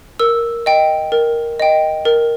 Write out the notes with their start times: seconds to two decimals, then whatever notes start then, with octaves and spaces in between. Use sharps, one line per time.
0.19 A#4 E6
0.66 D#5 G5
1.12 A#4
1.60 D#5 G5
2.05 A#4